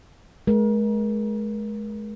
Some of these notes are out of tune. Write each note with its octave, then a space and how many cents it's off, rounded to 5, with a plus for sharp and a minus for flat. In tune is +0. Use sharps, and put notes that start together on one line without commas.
G#3 +35 A#4 +35